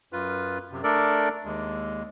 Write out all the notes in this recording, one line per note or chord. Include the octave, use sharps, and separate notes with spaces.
F#2 F4 B4
F#2 C3
A3 D4 A4 A#4 D5
D#2 G#3